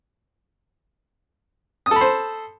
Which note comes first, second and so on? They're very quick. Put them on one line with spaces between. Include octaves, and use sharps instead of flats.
D#6 A4 B5 C5